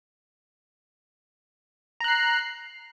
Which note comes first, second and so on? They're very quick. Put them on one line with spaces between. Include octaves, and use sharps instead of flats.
A#5 F#6 C7